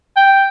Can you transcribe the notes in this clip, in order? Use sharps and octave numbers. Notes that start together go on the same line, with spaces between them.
G5